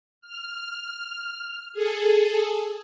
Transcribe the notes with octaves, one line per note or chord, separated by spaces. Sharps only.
F6
G#4 A4